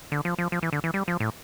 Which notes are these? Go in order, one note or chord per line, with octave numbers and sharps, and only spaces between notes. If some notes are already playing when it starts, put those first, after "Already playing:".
D3
F3
F3
F3
E3
D3
E3
G3
F3
A2